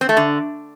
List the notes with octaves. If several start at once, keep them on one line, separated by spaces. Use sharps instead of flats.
C4
A3
D3